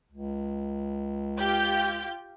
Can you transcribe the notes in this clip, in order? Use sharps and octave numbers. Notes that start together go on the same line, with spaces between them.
C#2
F4 G4 G6